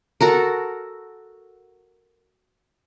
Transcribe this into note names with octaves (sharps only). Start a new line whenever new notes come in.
F#4 A4 A#4